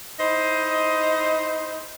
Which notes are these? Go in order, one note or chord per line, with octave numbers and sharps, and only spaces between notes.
D#4 E4 C5 D#5